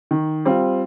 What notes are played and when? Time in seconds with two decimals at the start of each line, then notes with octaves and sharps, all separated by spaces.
0.11 D#3
0.45 G3 C4 F4